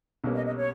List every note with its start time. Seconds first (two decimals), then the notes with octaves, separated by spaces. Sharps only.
0.24 B1 B2 G3 A#3 C#4
0.35 D#5
0.46 D#5
0.57 C#5